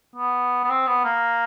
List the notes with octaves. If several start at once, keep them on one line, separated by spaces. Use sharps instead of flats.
B3
B3
C4
B3
A#3